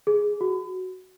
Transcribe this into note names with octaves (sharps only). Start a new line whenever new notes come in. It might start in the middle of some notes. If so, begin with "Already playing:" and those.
G#4
F#4